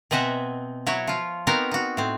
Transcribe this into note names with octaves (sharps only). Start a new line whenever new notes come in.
B2 C4 D#5 E5 F#5 G#5
F#3 E4 F#4 C#5
F3 F4
B3 C4 D#4 F#4 A#4
D#4 F#4
A2 C4